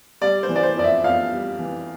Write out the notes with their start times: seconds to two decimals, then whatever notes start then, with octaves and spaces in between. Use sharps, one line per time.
0.21 G3 D5
0.43 C5
0.49 E3
0.56 D5
0.63 C5
0.77 F2 D5
0.84 E5
1.04 F2 F5
1.32 G3
1.59 E3